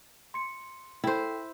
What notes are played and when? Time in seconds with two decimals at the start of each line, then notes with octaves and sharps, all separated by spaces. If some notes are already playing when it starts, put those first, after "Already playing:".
0.34 C6 C#7
1.04 E4 A4 C5 G5